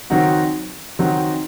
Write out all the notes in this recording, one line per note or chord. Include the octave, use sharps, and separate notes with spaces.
D#3 F#3 C4 D#4 F#4
D#3 F#3 C4 D#4 F#4